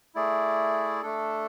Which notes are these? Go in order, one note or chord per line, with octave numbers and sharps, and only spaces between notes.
A3 E4 G#4 D5
A3 D4 A4